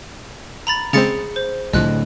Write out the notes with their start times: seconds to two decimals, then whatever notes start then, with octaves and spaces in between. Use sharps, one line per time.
0.67 A#5 B5 A6
0.93 C#3 G#3 C4 G#4 A6 C#7
1.36 C5
1.73 C2 A2 D3 F3 D#5 F#6